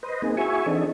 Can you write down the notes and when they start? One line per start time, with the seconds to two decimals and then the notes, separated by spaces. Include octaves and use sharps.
0.03 B4 C5 D#5
0.22 A#3 C4 D#4 G#4
0.37 E4 F#4 G#4 E5 G#5 C#6
0.66 E3 C4 D4 D#4 G#4 A4